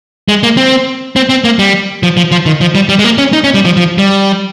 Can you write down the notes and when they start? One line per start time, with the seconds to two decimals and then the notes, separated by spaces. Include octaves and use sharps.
0.28 G#3
0.43 A#3
0.57 C4
1.16 C4
1.29 C4
1.44 A#3
1.59 G3
2.03 F3
2.17 F3
2.32 F3
2.46 D#3
2.61 F3
2.75 G3
2.89 G3
2.99 G#3
3.04 A#3
3.18 C#4
3.33 D#4
3.44 C#4
3.54 G3
3.65 F3
3.77 F3
3.98 G3